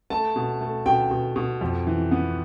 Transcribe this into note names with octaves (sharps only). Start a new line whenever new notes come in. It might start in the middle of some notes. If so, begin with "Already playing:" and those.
A3 A5
B2
A3
B2 G5
B2
B2
F2
E3
B3